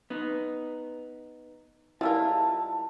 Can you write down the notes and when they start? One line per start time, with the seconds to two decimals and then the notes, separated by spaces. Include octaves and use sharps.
0.10 B3 D#4
2.01 G3 G#3 E4 F4 A#4 E5 F5 A5